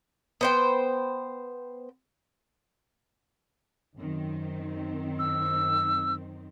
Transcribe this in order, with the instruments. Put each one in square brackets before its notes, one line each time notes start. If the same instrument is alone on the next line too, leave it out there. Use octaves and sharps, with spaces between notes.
[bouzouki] B3 C5 G5
[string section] F#2 D#3 C4
[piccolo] E6